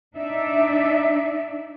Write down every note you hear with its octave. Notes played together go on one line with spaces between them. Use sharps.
D4 D#4 D5 E5